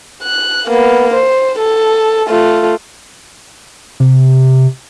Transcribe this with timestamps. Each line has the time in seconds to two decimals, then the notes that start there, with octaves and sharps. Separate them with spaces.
0.23 F#6
0.67 A#3 B3
1.14 C5
1.59 A4
2.28 A3 F4
4.00 C3